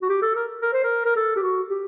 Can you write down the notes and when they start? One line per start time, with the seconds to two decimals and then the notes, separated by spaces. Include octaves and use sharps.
0.02 F#4
0.09 G4
0.22 A4
0.36 A#4
0.62 A#4
0.73 C5
0.83 A#4
1.05 A#4
1.16 A4
1.36 G4
1.43 F#4
1.69 G4